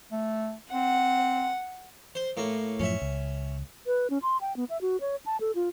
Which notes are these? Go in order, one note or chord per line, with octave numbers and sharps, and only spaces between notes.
A3
C4 F#5
C5
A2 A#3
F#2 A2 F3 C#4 E5
C#2
B4
C#4
C6
G5
B3
E5
F#4
C#5
A5
A4
F4